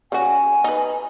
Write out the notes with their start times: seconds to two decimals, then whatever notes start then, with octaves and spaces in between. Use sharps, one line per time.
0.12 C#3 F#4 G#5
0.64 D#4 B4